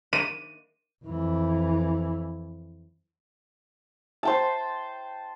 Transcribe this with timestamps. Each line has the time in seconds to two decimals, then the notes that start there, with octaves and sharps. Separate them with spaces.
0.13 D#7
1.04 F2 E3
4.23 C5 G5 A5